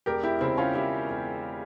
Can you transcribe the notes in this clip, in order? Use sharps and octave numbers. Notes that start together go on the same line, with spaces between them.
E1 G4 A#4
E4 G4
C#3 C4 E4
C#4 F4
E1 E4 G4
E1